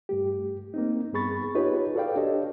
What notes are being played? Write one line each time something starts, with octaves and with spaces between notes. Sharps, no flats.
G2 A3 G4
A#3 C4 D#4
G2 B3 G#4 B5 C#6 A6
D#4 F4 G4 G#4 B4 C#5
F#4 A4 B4 D5 F5 G5
D4 G4 A4 C#5 D#5